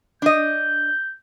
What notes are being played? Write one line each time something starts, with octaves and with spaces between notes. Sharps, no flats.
D4 D#5 G6